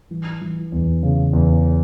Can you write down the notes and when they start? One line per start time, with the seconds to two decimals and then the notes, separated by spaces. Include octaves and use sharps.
0.11 E3
0.41 E3
0.72 E2
1.03 C#3
1.33 E2